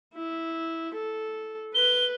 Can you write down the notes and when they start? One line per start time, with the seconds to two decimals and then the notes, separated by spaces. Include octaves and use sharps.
0.14 E4
0.95 A4
1.75 B4 G7